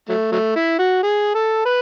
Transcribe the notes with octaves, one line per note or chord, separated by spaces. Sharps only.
F#3 A3
F#3 A3
E4
F#4
G#4
A4
B4